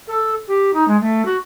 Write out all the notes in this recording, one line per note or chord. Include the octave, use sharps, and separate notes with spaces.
A4
G4
D#4
G#3
A3
F#4